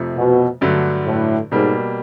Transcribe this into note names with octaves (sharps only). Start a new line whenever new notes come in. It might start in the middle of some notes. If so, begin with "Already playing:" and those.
Already playing: F2 C3 F3 A3
B2
G2 D3 F#3 A3
A2
G#2 B2 G3 A#3